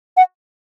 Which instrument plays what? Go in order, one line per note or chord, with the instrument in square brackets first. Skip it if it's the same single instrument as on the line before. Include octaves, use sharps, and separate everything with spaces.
[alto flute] F#5